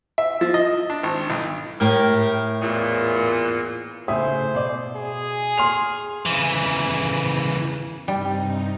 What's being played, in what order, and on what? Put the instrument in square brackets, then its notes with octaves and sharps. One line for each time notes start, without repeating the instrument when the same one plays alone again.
[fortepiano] E5
F3
D#5
D4
G#1
B1
[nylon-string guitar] A2 [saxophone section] G4 A#4
[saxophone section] E2 A#2
[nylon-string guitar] A2 C#3 [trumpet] C5 [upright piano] E5 D#6
[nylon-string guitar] B2 D5
[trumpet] G#4
[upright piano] C6 F6 F7
[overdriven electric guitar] C#3 E3
[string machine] G2 C3 D#4 [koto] G3